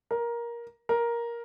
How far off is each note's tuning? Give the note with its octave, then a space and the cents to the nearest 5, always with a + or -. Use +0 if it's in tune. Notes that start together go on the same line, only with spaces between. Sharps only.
A#4 +15
A#4 +10